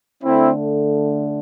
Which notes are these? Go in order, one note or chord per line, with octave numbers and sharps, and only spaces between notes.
D3 A3 C4 E4